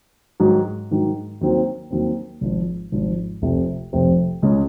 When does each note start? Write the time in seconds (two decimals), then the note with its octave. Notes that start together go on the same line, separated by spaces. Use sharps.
0.40 G#2 D#3 F#3
0.91 G#2 D#3 F#3
1.41 D#2 D#3 F#3 C4
1.91 D#2 D#3 F#3 C4
2.41 G#1 G#2 F3
2.92 G#1 G#2 F3
3.42 F1 F2 C3 F3 C4
3.93 F1 F2 C3 F3 C4
4.42 C#2 C#3 G#3 C#4